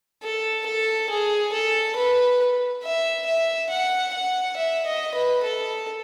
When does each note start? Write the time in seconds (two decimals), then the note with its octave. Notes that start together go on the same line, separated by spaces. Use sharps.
0.22 A4
0.65 A4
1.09 G#4
1.52 A4
1.96 B4
2.83 E5
3.26 E5
3.70 F#5
4.13 F#5
4.56 E5
4.85 D#5
5.14 B4
5.43 A4